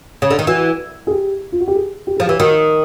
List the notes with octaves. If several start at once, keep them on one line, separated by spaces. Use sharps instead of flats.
C#3
D3
D#3
E3 F#4
G#4
G4
F4
F#4
G4
G#4
G4
F3 G#4
G4
E3
D#3 F#4